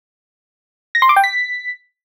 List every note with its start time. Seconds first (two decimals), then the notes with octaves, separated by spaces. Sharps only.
0.95 A#6
1.02 C6
1.09 D6
1.16 G5
1.24 B6